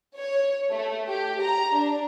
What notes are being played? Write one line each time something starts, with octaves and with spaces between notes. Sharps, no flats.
C#5
A3
G4
A#5
D4